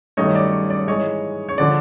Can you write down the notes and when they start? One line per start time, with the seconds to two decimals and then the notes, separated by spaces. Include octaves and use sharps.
0.17 G2 D#3 F#3 A3 C#5 D#5
0.35 D5
0.52 C#5
0.70 D5
0.87 G#2 E3 G#3 C#5 D#5
1.49 C#5
1.58 D3 F3 D5